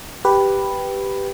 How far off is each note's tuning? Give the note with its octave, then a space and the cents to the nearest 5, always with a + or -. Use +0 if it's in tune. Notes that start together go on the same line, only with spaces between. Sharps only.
G4 +0 B4 +0